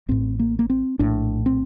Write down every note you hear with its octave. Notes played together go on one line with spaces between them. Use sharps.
A1 A2 C4
A#3
A#3
C4
A#1 A2 D4
C4